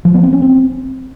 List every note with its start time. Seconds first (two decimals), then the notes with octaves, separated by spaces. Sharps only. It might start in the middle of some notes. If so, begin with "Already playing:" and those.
0.05 F3
0.14 B3
0.23 C4
0.33 C#4
0.42 C4